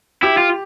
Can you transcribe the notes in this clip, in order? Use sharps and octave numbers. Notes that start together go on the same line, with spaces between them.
E4 G4
F4